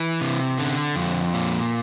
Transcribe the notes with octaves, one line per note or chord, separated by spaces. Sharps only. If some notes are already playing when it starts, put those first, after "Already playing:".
Already playing: E3
C3
D3
F2
A#2